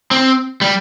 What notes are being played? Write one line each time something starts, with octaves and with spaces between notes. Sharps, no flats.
C4
G3